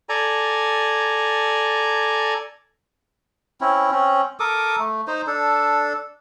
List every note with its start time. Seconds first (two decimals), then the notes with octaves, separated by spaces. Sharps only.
0.09 A4 D5 G#5 A#5
3.61 C4 C#4 E4
3.91 C4 C#4
4.40 A4 A#4 D6 D#6
4.79 A3
5.07 D#4 C5
5.27 D4 A4